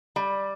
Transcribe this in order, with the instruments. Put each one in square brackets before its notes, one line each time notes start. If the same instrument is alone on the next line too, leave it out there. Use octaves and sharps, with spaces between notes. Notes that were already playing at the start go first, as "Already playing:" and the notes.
[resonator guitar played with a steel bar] G3